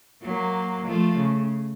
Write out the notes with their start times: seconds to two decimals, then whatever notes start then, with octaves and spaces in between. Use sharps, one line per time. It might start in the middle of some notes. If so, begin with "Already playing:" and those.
0.23 F#3 A#3
0.86 F3 A3
1.17 C#3